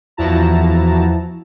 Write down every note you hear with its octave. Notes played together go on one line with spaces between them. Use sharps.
E2 F3 E4 F#4 A5 A#5